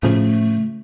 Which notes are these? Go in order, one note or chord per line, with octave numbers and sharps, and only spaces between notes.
A2 C#3 F3 A3